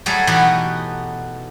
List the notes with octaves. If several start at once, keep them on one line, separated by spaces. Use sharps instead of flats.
F#3 G3 A3 G#4 A4
B2 E3 B3 D#4 F#4 G4